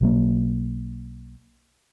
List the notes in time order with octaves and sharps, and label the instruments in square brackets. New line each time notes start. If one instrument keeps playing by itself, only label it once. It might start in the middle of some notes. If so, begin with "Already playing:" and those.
[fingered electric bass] B1 F#3 A#3